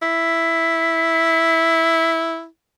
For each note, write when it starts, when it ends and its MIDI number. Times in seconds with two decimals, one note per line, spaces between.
0.02 2.46 64
0.02 2.11 95